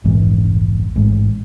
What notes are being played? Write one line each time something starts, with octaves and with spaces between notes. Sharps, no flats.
F1 A#1 G#2 E3
A1 G#2